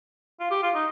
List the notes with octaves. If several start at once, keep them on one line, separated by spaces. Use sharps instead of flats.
F4
G4
F4
D#4